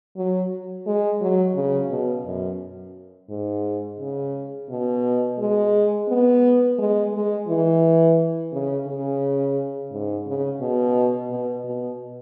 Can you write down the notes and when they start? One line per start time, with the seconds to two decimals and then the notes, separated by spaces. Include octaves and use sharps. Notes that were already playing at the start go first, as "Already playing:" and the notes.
0.17 F#3
0.87 G#3
1.21 F#3
1.56 C#3
1.91 B2
2.26 F#2
3.30 G#2
4.00 C#3
4.70 B2
5.38 G#3
6.08 B3
6.79 G#3
7.13 G#3
7.48 E3
8.53 C#3
8.87 C#3
9.92 G#2
10.26 C#3
10.61 B2
11.31 B2
11.65 B2